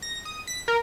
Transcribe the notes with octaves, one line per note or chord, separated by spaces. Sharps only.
A#6
D#6
B6
A#4